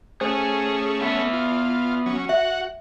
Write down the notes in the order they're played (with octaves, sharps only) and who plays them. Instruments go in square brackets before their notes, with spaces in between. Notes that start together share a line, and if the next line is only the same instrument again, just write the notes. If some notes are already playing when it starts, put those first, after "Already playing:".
[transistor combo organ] A3 C#4 [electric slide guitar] G#4 [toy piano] C5
[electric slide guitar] B3 E5
[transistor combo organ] F4
F#3 C#4
[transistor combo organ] F#4 F#5 [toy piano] E5